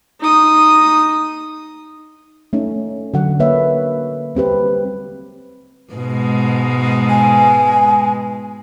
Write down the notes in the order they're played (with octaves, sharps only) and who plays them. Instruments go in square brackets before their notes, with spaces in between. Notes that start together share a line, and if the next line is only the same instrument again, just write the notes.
[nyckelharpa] D#4 D#6
[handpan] A3 C#4 D#4
D3 F#3 F#5
A#3 B4 C#5 E5
G3 C4 G4 B4
[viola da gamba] G#2 B2 G#3
[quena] G#5